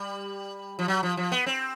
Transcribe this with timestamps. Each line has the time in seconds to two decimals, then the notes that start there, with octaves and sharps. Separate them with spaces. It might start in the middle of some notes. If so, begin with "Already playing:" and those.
Already playing: G3
0.79 F3
0.88 F#3
1.03 F3
1.17 F3
1.32 B3
1.46 C4